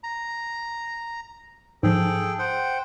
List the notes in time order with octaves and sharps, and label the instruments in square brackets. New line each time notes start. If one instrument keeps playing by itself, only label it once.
[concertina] A#5
[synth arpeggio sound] G#2 F3 [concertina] G#4 A4 G5
[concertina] C5 F#5 G5